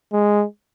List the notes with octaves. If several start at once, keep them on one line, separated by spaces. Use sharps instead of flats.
G#3